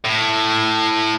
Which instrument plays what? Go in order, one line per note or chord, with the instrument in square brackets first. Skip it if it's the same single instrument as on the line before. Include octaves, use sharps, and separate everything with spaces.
[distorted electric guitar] A2